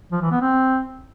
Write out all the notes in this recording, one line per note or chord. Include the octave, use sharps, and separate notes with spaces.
F3
E3
B3
C4